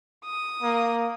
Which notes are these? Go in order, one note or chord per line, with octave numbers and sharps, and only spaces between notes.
D#6
A#3